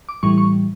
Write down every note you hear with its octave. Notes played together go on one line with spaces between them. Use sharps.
D6
A2 E3 G3 C#6
C#6